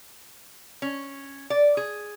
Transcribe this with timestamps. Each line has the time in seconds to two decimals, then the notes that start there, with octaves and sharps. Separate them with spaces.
0.82 C#4
1.50 D5
1.77 G#4